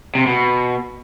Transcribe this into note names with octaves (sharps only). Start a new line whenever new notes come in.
C3
B2